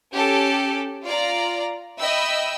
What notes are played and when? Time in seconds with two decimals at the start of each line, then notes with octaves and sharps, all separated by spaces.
0.13 C#4 G4 A4
1.06 F4 D5 A#5
1.98 D#5 E5 G5 B5 E6